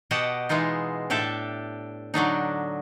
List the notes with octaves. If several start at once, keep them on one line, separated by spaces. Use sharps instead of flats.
B2 G4 D#5 F#5 G5 A5
E3 G#3 B3 D#4 F4
A2 D4 G4 A4 E5
D3 F#3 D4 D#4